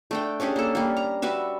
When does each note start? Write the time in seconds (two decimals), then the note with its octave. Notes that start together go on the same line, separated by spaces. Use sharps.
0.11 A3 D4 G5
0.40 C#4 D4 G4 G#4
0.56 A#3 A4
0.75 G3 A#3
0.97 A#5
1.22 G3 F#4 B4 E5